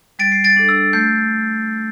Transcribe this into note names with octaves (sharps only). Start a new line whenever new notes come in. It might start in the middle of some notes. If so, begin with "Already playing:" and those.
G3 A6 D7
C7
A6 D7
D4 A4
E6 A6
A3 G6 C7